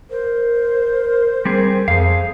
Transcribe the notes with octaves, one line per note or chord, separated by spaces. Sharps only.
A#4 C5
G3 C4 G#4
F2 G#4 F5